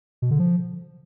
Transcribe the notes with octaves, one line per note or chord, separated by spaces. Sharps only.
B2
D3
F3